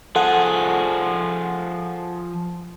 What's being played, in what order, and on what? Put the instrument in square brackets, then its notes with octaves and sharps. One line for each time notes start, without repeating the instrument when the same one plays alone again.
[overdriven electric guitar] F3 G#4 [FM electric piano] A4 F#5